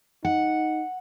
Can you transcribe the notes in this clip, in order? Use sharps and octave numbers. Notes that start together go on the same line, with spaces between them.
D#4 F#5